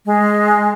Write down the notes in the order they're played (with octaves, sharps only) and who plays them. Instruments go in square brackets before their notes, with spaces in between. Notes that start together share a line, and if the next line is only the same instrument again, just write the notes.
[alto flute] G#3